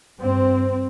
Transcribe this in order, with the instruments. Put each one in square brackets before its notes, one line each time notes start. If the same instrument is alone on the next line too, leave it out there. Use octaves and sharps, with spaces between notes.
[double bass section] G2 C4